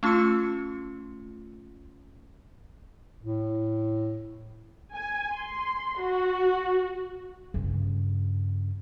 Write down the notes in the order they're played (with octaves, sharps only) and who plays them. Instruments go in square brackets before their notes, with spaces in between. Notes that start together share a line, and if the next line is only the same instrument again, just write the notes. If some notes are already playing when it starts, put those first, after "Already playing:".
[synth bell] A3 C#4 F4 C6 E6 C#7
[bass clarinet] A2
[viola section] G#5
C6
F#4
[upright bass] G2 C#3